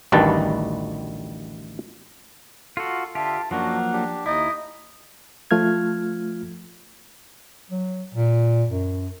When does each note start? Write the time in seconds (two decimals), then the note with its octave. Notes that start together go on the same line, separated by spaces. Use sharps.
0.12 A1 D2 D#3 G3 B4 A5
2.77 F4 F#4 A4
3.15 D3 F4 G4 E5 A5
3.51 F#2 F3 F#3 A#3 D4 F#4 F#5
3.93 D4 G4
4.26 D#2 D#4 E4 D#5
5.51 F3 A3 F4 F6 G#6
7.71 F#3
8.14 A#2
8.69 F#2